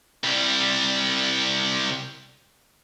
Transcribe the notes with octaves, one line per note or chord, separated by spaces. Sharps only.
C2 G3